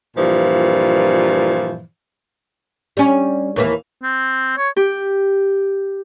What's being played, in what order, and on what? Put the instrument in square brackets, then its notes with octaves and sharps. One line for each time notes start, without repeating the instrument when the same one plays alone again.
[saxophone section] G2 A#2 E3 F3
[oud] G3 C#4
D#2 E3 A#3
[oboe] C4
C#5
[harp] G4